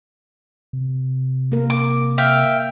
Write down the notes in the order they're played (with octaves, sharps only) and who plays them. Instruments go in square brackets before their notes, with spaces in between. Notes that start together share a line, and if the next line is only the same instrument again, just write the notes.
[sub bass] C3
[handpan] A#3 A#4
[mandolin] D6
[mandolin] E5 F5 [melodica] G5